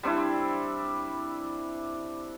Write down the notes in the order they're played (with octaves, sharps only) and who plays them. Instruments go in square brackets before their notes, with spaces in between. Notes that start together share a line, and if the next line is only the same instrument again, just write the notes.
[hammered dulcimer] G3 C4 D4 E4